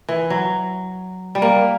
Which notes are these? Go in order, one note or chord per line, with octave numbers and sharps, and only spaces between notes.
E3
F#3
G3
A#3